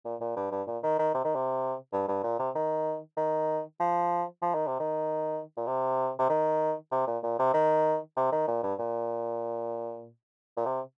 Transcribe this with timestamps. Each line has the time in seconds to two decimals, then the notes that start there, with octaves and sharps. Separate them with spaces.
0.05 A#2
0.21 A#2
0.36 G2
0.51 G2
0.67 A#2
0.83 D#3
0.99 D#3
1.14 C3
1.25 D#3
1.35 C3
1.93 G2
2.08 G2
2.23 A#2
2.39 C3
2.55 D#3
3.17 D#3
3.80 F3
4.42 F3
4.54 D#3
4.67 C3
4.80 D#3
5.57 A#2
5.67 C3
6.19 C3
6.29 D#3
6.91 C3
7.07 A#2
7.23 A#2
7.39 C3
7.54 D#3
8.17 C3
8.32 D#3
8.47 A#2
8.63 G2
8.79 A#2
10.57 A#2
10.66 C3